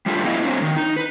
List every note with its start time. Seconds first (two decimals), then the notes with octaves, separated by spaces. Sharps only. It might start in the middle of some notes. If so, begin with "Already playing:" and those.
0.06 G3 A3 D4 F4 G4
0.24 A3 B3 E4 D#5 F5
0.44 F#3 C4 D4
0.62 D#3
0.76 D#4
0.96 B4